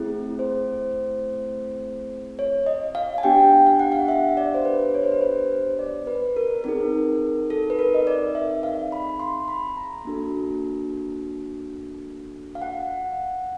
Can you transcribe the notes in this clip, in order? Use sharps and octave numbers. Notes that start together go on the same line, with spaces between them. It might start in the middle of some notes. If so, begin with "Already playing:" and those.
Already playing: A3 C4 E4 G#4
C5
C#5
D#5
F5
G#5
B3 D4 G4 G5
F5
F#5
F5
E5
D5
C5
B4
C#5
C5
B4
C5
D5
B4
A#4
C4 D#4 G#4 A#4
A4
B4
A#4
D#5
D5
E5
F5
B5
C6
B5
A#5
A#3 D4 F#4 A4
F5
F#5